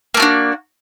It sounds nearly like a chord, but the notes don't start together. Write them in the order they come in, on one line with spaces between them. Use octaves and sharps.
A#3 A3 F#4 D4